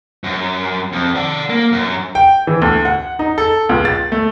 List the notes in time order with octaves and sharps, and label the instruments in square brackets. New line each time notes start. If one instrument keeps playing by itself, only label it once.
[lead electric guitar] F#2
F2
D5 F#5
A#3
F#2
[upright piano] G5
E3
D2
F#5
D#4
A4
C#2
A6
A3